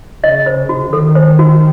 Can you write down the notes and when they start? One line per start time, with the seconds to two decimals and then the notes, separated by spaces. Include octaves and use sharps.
0.23 C#3 D#5
0.46 C5
0.69 F#4
0.92 D#3 A4
1.15 C5
1.39 F#4